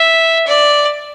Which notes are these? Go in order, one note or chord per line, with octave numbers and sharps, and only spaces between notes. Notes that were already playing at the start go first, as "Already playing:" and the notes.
Already playing: E5
D5